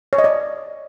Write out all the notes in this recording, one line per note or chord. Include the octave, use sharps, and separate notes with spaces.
C#5
D#5
D5